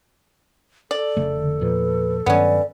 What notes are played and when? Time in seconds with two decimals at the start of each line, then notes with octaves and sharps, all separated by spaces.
0.91 A4 D5
1.17 F1 C#3 A3
1.36 D3
1.61 E2 A#2 F3 B4
2.26 G2 D#3 F#3 B3 C#4 D5